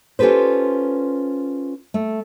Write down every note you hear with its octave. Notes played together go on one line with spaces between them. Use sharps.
C#4 F4 G4 A4 B4 C5
A3